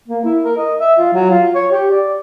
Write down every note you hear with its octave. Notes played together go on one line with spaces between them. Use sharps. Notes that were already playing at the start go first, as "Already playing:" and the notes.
A#3
E4
A#4
D#5
E5
F4
F#3
F4
C#5
G4
D5